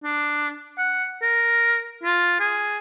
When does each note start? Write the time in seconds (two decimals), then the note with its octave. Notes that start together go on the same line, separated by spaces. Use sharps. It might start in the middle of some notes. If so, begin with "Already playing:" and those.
0.04 D4
0.78 F#5
1.22 A#4
2.03 F4
2.40 G#4